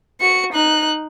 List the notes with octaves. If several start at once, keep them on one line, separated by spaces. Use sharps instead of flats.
F#4 C#7
D#4 F#6